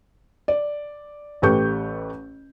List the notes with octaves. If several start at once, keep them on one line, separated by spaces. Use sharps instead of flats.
D5
A1 A3 G4 B4 C#6 G6